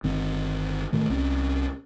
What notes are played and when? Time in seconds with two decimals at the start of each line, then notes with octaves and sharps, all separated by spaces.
0.04 G1 D#3 C4
0.93 A2 D#3 A3
1.10 C2 C4 C#4